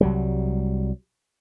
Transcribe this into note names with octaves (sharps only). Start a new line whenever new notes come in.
C2 F#3 G3